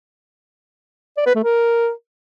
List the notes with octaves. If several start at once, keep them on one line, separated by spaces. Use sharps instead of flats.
D5
B4
A3
A#4